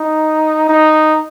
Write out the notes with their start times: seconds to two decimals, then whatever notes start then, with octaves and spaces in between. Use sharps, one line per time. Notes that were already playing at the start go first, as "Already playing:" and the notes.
Already playing: D#4
0.69 D#4